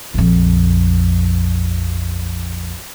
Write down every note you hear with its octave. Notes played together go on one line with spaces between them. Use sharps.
A#1 F2